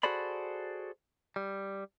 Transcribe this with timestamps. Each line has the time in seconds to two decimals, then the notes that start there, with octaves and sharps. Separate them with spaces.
0.03 F#4 G#4 A4 C5 D5 B5
1.36 G3